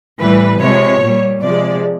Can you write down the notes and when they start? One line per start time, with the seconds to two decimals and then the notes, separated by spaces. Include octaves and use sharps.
0.20 A2 E3 G3 B4
0.61 C3 F3 G#3 C#5
1.02 A#2 G3
1.42 C3 F3 G#3 D5